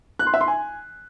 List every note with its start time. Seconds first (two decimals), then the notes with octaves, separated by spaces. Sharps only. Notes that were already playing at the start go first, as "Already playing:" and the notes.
0.19 F#6
0.27 C6
0.34 E5
0.41 C6
0.48 G#5